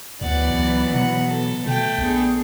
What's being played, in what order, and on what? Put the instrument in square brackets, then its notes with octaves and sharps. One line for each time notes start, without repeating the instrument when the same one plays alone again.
[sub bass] D2 [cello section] E3 F#3 B3 [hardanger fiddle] D5 F#5
[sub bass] C#2
[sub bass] B2 [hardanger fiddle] F#5
[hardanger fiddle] A4
[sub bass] B2 [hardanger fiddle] A3 G5
[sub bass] A#1 [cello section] B3 D4 G#4